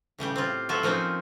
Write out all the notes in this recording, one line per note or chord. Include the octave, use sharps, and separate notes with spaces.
A2 C#3 G3 G4
C4 F4
F#3 F4 F#4 A4 E5
F3 A#3 C4 C#4 D#4